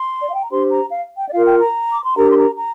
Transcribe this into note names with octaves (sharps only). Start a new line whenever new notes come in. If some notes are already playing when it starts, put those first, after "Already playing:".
Already playing: C6
D5
F5
G5
A#5
D4 G4 C5 C6
A#5
F5
G5
D5
F4 A#4 F5
G5
A#5
D6
C6
D4 G4 A#4 A#5
C6
A#5
A#5